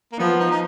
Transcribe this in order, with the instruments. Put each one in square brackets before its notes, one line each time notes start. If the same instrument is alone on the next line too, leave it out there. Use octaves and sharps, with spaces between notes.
[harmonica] A#3
[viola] F3 [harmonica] B3
[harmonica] D#4
D#4